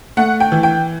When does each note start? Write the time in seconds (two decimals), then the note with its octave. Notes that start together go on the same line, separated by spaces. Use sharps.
0.17 A3 F#5
0.40 G5
0.52 E3
0.63 G5